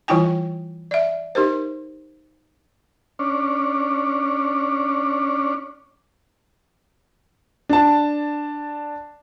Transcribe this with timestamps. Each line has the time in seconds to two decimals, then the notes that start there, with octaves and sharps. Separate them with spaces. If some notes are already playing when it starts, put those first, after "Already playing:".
0.08 E3 G3 E4 F4 G5 G#5
0.91 D5 E5
1.35 D#4 G4 A#4 C5
3.19 C#4 D4
7.69 D4 A5